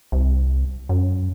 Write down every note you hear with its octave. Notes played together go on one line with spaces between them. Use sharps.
C2
F#2